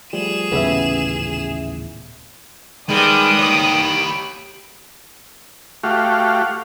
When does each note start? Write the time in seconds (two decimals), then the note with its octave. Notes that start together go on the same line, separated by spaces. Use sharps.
0.13 F3 G3 A3 G#4 E7
0.52 D#1 A1 C#3 B3 G4 E5
2.89 D#3 G3 G#3 B3 G5 B5 D#6
3.39 G4 C#5
5.84 A3 F#4 G4 F5